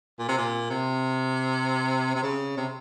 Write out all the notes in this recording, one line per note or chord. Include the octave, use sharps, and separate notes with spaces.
A#2
C3
A#2
C3
C3
C#3
C3